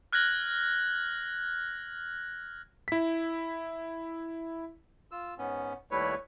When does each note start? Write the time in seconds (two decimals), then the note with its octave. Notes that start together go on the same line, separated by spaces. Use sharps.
0.13 F6 F#6 G#6 A#6 F#7
2.88 E4 B6
5.11 F4 E6
5.38 G#2 B3 C#4
5.91 D#2 G3 A3 E4 B4 C#5